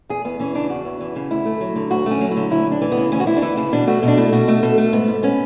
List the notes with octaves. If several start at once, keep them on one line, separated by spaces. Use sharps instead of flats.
E2 G#4
E2 B3
E3 C#4
C#3 D4
E2 F#4
E2
E3
C#3
D2 E4
A3
F#3
D3
D2 F#4
A3
C#4
F#3
E4
D3
D2 E4
D2
D4
E3
B3
C#3
D2 C#4
F#4
D2 E4
D4
E3 E4
C#3 E4
B2 D4
A3 F#4
B2
D4
A3 E4
B2 F#4
A3
B2 A4
A3
G#2 B3
G#2
B3 C#4